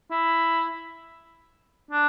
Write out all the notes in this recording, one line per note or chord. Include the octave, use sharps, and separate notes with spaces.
E4
D4